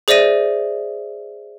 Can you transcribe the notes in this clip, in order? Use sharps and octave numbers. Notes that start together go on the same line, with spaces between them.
G#4 C5 D5 E5 A#6 D#7